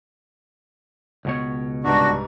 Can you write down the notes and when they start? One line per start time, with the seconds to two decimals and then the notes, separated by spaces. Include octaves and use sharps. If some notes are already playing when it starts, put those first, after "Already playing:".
1.25 C#2 B2 C#5
1.84 C2 G#2 D4 F#4 B4